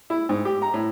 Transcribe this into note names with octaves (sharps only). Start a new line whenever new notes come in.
E4
G#2
G4
A#5
A2